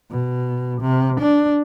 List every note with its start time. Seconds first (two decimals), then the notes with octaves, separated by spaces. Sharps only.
0.11 B2
0.82 C3
1.21 D4